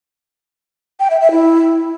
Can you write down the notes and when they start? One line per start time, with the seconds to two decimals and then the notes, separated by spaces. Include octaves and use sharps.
1.00 G5
1.10 E5
1.21 E5
1.32 E4